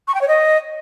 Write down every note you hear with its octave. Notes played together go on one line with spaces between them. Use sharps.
C#6
G5
C#5
D#5